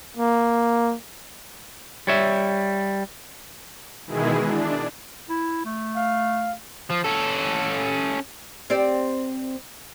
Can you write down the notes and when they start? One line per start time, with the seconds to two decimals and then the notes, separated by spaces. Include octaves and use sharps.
0.17 A#3
2.07 G3 C#5 E5
4.06 B2 D#3 E3 G#3 E4 G#4
4.42 D4
5.30 E4
5.65 A3
5.96 F5
6.90 F3
7.04 C#4 A4
8.70 C4 G4 D5